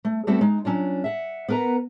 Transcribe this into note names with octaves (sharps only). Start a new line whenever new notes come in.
A3
G3 A3 B3 C4 F#4 A4
G#3 D#4
F#3 C#4 D4 F4
E5 F#5
B3 A#4 B4 F#5 A#5